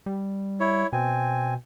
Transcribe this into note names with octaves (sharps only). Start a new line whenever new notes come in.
G3
E4 C#5
B2 C4 G#5